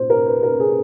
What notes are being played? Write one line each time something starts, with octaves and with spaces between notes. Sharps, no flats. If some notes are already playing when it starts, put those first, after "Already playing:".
Already playing: A#2 C5
A#4
B4
A#4
G#4